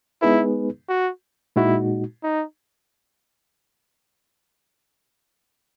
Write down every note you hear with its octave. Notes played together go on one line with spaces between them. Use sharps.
G#3 B3 D#4 E4 G#4 B4
F#4
A#2 G#3 D#4 E4 F#4
D#4